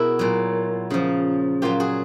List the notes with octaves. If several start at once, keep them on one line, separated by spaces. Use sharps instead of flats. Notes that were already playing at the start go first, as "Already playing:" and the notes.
Already playing: B2 E4 F#4 G#4 A#4
A#2 F#3
C#3 F3
A#2 F#3 F4 G4
F#4 G#4